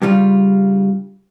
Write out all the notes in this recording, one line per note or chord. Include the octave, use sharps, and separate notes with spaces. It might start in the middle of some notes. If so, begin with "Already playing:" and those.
G2 C#3 G3 F4